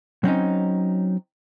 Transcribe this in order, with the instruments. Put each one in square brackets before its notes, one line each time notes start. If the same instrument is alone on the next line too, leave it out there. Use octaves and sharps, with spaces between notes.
[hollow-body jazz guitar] F#3 C4 C#4 D#4